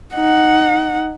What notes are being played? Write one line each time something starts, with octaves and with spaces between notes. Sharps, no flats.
D#4 F#5